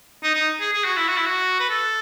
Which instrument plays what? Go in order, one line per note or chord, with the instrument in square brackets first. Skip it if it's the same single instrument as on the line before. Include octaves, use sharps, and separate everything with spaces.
[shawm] D#4
D#4
G#4
G#4
F#4
E4
F#4
E4
F#4
B4
A4